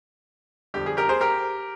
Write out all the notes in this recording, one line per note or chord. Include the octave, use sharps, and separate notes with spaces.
F2 D3 G3 G4
G#4
G4 A#4
G#4 C5
G4 A#4